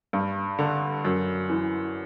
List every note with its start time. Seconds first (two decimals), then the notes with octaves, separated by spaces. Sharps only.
0.13 G2
0.59 D3
1.05 F#2
1.50 E3